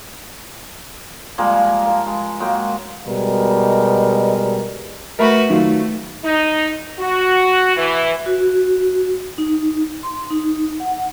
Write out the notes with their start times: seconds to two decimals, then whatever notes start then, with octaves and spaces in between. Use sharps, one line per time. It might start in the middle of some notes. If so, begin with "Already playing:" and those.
1.38 F3 G3 G#3 A#3
1.86 A#4 A5
2.07 G#3
2.40 F#3 G#3 A#3 G5
3.07 B2 G3 G#3 A#4
5.19 A3 F#4 A#4 B4 E5 B5
5.50 D#3 F#3 A3 F4
6.25 D#4
7.00 F#4
7.77 E3
8.26 F#4
9.38 D#4
10.03 C6
10.31 D#4
10.80 F#5